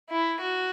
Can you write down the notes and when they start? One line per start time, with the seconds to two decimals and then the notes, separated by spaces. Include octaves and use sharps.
0.10 E4
0.41 F#4